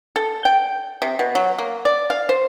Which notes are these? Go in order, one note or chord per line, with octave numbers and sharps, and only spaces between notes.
A4
G5
C3
B2
F#3
A#3
D5
F5
C5